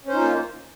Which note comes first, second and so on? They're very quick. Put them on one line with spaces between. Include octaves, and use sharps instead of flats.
C#4 C5 D#4 F4 A#3